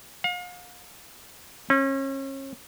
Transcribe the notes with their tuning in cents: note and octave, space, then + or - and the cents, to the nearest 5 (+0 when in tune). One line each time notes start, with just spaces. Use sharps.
F5 +40
C#4 -35